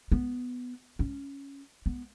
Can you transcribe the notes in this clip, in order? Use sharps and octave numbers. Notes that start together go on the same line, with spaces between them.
B3
C#4
B3